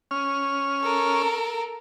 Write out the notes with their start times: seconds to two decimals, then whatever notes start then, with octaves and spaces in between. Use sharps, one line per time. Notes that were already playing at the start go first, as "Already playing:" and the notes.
0.11 C#4 F6
0.81 A4 A#4